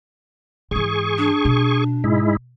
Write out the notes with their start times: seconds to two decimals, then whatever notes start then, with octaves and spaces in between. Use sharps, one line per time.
0.71 G#2 E3 G#4 C#6
1.18 D4
1.45 B2
2.04 G#2 G#3 E4